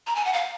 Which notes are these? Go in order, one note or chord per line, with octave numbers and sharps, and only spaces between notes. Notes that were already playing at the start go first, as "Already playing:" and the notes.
A#5
G#5
F#5
F5